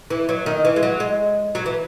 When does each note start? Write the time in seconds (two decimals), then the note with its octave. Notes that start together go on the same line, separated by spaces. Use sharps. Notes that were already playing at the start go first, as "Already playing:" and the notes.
0.10 E3
0.29 F#3
0.46 D#3
0.65 E3
0.76 G#3
0.83 F#3
1.00 G#3
1.55 F#3
1.66 E3